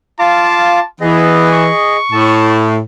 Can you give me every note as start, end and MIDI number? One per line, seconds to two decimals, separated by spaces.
0.19 0.79 65
0.19 0.79 77
0.19 0.86 81
0.19 0.79 86
1.01 1.69 52
1.01 1.48 59
1.01 1.97 68
1.01 1.97 75
1.52 2.54 85
2.12 2.80 45
2.12 2.56 81